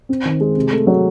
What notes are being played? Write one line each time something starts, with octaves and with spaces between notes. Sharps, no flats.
C4
D#3
G#3
C3
A3
F#3